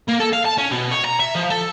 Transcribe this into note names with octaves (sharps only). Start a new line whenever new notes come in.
A#3
A4
F5
A5
C#4
B2
C#5
A#5
E5
F3
A4